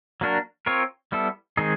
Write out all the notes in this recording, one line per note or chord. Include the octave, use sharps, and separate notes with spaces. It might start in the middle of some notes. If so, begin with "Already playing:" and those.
F#3 A#3 D4 F#4 A#4
C4 F4 A#4 C#5
G3 B3 E4 A4
D#3 G#3 C4 D#4 G#4